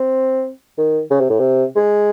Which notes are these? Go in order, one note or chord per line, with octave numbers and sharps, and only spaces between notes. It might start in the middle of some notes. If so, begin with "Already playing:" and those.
Already playing: C4
D#3
C#3
C3
A2
C3
G#3